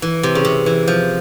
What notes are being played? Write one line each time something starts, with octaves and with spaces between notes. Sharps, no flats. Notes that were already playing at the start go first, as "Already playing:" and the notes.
E3
C3
C#3
C3
E3
F3